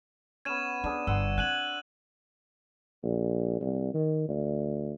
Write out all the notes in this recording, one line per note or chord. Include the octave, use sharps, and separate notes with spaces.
B3 C#4 G#6 D#7 E7
B3 D4 G#4
G1 F#5 G5 C6 E6
C4 G#5 F#6 D#7 F#7
A#1
C2
D#3
D2